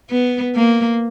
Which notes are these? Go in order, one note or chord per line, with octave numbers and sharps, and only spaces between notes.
B3
A#3